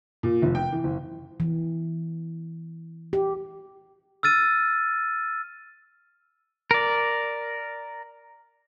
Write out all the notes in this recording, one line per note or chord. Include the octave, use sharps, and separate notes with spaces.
A#2
F1
G5
E3
F#1
E3
G4
E6 F6 A6 D#7
A#4 D5